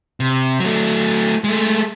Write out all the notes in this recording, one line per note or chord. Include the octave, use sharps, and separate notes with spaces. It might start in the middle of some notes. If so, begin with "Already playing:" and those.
C3
F#3 A3
G#3 A3